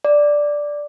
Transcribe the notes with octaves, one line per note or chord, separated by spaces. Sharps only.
D5